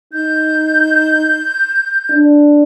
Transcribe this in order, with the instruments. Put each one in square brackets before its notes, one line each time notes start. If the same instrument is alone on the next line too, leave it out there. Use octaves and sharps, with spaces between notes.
[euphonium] D#4 [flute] G6
[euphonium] D4